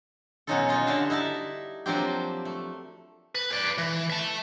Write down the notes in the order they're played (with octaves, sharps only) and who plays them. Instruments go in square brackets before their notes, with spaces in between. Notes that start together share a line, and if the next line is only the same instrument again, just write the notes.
[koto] B2 F#3 C#4 D#4 F4 A4
A#3 D#4 F4
D3 G3 F#4 E5 F5 A5
D#4 E4 E5 A5
F3 F#3 A#3 C4 D4 G4
A3
[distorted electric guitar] B4
B4 D5
E3
E5 A5